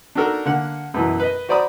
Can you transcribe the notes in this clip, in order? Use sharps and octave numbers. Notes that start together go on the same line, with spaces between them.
D4 D#4 F#4 A4 A#4
D3 A#3 F#5
F#2 B2 E3
B4 D#5
F#4 C5 D5 A#5 B5 D#6